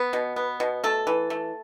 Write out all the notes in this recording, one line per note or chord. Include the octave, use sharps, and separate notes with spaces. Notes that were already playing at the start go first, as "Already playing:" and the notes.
Already playing: B3
B2
B3
B2
A3 A4
E3
A3